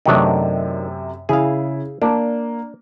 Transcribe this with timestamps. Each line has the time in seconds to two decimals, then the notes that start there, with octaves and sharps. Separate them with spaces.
0.06 F#2 C3 D#3 F#3 A3 D4
1.29 C#3 E4 G#4 F5
2.02 A#3 D4